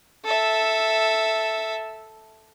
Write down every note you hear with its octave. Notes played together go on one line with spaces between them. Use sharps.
A4 E5